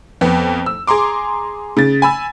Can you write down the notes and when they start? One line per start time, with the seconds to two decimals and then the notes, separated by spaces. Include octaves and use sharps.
0.21 F2 B3
0.66 E6
0.87 G#4 A#5 C6 D6
1.77 C#3 A6
2.02 G#5 B5 E6